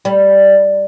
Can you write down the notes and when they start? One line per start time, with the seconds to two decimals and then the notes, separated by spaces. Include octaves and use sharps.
0.05 G3